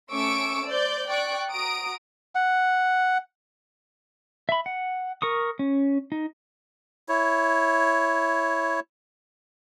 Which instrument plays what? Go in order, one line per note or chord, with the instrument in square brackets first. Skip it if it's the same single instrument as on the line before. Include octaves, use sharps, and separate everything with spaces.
[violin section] A3 C#4 C#6 D6 E6 D7
C5 D5 G6
D5 G5 C#6 F#6 D7
F#4 A#5 D#6 D7
[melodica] F#5
[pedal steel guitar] E5 B5
F#5
A#4 C#6 D#6
C#4
D#4
[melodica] E4 C#5